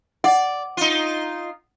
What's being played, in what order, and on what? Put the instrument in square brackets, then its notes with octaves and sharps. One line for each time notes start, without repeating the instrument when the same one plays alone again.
[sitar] D5 [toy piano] F#5
[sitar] D#4 F4